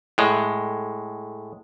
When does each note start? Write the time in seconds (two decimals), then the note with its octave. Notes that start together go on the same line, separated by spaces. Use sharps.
0.18 A2 G#3